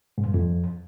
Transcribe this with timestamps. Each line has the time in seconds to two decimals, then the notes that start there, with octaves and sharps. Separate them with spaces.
0.18 G#2
0.26 G2
0.34 F2